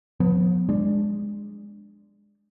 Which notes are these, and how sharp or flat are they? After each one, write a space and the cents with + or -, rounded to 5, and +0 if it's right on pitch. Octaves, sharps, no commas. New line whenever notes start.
F3 +40 B3 -5
G#3 -10 D4 +0